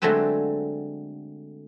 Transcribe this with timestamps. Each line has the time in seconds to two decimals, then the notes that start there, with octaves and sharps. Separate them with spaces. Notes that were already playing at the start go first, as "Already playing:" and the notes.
0.02 D3 F#3 G#3 A3 C4 B4